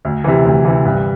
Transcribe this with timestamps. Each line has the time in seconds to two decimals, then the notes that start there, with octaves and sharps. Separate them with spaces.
0.05 D2
0.24 C3 E3
0.45 D2
0.65 C3 E3
0.85 G2